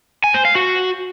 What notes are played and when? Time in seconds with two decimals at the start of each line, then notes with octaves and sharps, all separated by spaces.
0.24 G#5
0.34 C5
0.45 F5
0.55 F#4